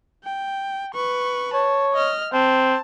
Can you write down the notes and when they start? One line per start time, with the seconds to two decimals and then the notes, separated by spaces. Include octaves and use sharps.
0.24 G5
0.94 B4 C#6
1.54 C#5 A5
1.94 D#5 F6
2.33 C4 A5